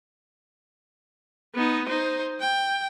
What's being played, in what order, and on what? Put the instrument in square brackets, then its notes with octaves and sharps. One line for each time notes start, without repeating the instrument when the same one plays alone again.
[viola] B3 D#4
D#4 C5
G5